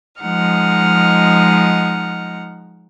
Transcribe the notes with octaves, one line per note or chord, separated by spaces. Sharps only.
F3 G#3 D#4 F#5 F6